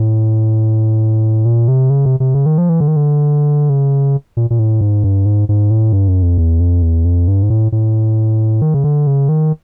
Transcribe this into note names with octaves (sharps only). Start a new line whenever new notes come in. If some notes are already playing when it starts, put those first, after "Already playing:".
Already playing: A2
A#2
C3
C#3
C3
C3
C#3
D#3
F3
E3
D3
D#3
D3
C#3
A#2
A#2
A2
G#2
G2
G#2
G#2
A2
G2
F#2
F2
E2
F2
E2
F2
G2
G#2
A2
A2
D#3
C#3
D3
C#3
D#3